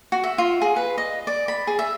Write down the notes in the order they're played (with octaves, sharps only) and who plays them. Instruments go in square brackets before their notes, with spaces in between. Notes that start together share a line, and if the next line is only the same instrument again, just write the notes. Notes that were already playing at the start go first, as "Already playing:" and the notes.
[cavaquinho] F#4
E5
F4
G#4
B4
D#5
D5
B5
G#4
E5